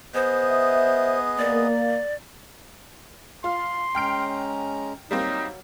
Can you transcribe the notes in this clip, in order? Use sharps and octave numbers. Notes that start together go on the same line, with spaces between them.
B3 G#4 C5 D#5
E5
A#3 D5
F4 C6
G#3 C#4 G5 A#5 F6 D7
F#3 G3 A#3 C4 D#4